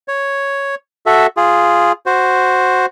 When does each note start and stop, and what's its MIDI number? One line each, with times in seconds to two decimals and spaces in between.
0.08 0.75 73
1.06 1.27 66
1.06 1.27 69
1.06 1.27 76
1.37 1.92 65
1.37 1.92 68
2.06 2.86 66
2.06 2.86 72